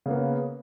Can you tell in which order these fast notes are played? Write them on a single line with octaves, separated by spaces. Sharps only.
C#3 A#3 B3